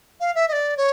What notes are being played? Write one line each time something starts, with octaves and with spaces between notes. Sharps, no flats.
F5
E5
D#5
D5
C#5